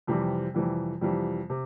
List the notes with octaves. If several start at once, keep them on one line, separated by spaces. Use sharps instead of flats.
F2 C3 E3 G3
F2 C3 E3 G3
F2 C3 E3 G3
C3